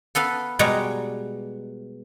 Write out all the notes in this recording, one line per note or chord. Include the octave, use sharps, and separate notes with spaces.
B3 A4 B4 F5
B2 G3 G#3 C#5 D5 A#5